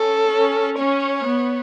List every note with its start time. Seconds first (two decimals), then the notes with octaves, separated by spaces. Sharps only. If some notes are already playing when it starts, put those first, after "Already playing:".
Already playing: C#4 A4
0.32 C#4
0.79 C#4 C#5
1.26 B3